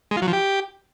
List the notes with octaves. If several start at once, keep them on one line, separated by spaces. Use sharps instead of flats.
G#3
F4
F#3
F3
G4